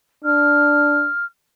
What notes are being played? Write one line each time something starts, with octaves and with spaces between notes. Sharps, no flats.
D4 F6